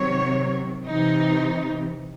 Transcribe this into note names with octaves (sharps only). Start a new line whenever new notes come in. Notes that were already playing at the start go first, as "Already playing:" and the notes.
Already playing: C3 D#3 F#3 C#5
C3 E3 D#4